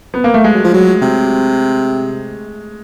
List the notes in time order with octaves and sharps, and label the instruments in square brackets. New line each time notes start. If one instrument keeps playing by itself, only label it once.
[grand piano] B3
A#3
A3
G#3
[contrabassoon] F#3
F3
F#3
C3